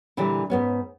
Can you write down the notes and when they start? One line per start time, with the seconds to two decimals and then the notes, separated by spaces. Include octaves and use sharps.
0.17 A#2 D3 E3 G3 D5
0.50 G#2 B3 C#4